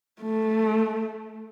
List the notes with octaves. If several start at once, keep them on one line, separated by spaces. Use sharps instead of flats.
A3